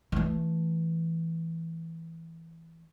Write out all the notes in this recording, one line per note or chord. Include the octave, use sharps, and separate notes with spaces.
E3 A3